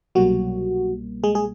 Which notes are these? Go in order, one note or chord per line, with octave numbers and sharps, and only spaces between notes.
C2 B2 F#3 G3 A#3 F#4
G#3 G#4
G#4